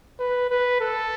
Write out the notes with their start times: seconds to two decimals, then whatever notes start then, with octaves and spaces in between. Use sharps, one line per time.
0.19 B4
0.50 B4
0.81 A4